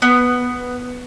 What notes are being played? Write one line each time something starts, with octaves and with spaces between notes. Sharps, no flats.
B3